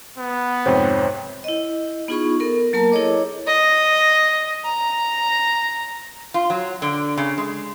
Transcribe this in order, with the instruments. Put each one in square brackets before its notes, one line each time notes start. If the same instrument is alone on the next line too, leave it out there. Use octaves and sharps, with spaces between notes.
[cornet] B3
[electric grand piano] F2 G#2 C3 [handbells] C5 C#5 G5
[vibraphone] E4 D#5
B3 D#4 F4 G#4 B5 C#6
B3 A4 A#4
F#3 A#3 A#4 A5 A#5
E4 G#4 A4 C#5 D#5 D6
[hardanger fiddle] D#5
A#5
[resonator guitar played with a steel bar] F4
F#3
D3
C#3
G#3